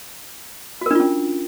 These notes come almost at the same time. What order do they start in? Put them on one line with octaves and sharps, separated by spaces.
F#4 A#4 D4 F4 C#4